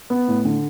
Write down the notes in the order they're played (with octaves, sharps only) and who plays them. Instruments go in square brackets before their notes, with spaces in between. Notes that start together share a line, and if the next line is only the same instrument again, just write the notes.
[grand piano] B3
A2
D3